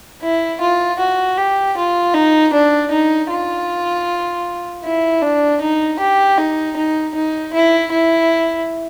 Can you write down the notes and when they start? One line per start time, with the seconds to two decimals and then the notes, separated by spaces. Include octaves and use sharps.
0.22 E4
0.60 F4
0.99 F#4
1.37 G4
1.77 F4
2.14 D#4
2.53 D4
2.91 D#4
3.30 F4
4.84 E4
5.22 D4
5.61 D#4
5.99 G4
6.37 D#4
6.76 D#4
7.14 D#4
7.53 E4
7.91 E4